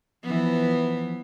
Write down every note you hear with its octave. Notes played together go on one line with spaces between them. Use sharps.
E3 F3 B3